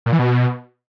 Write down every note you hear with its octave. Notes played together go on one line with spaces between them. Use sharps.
A#2
E3
B2